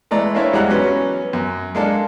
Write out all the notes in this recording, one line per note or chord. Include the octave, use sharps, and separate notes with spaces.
E3 G#3 A3 D5 A#5
A#3 C4 D4 E4 C#5 D5
E2 G3 G#3 F#5 A#5 F#6
F#3 B3 C#4
F#2
G#3 A#3 D4 A4